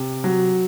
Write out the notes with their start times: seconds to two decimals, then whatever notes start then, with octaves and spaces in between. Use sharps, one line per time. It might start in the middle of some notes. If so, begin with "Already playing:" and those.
Already playing: C3
0.24 F#3